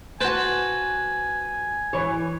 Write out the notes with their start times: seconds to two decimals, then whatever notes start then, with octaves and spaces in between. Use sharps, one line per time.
0.21 F#4 B4 C5 G#5 A5
1.93 E3 C#5